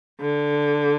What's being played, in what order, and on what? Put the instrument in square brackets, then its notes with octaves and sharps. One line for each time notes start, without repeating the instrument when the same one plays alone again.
[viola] D3